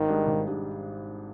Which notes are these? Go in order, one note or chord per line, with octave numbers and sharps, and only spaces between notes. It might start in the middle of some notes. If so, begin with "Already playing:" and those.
Already playing: G#1 D#3
G#2 G3 D4
G#1
G#2 G3 D4